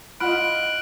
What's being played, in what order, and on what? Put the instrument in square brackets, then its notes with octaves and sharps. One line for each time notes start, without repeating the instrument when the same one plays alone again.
[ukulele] E4 F4 [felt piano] D#5 F#5 B5 [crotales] F6 D7 [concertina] F#6